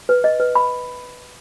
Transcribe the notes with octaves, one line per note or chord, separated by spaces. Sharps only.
B4
D#5
B4
B5